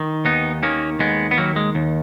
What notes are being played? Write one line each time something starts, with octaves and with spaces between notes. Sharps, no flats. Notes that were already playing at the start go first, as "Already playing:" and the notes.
Already playing: D#3
D#2 B3 D#4
D#3 A#3 C#4
D#2 G#3 B3
B3
D#3 F#3 A#3
G#3
D#2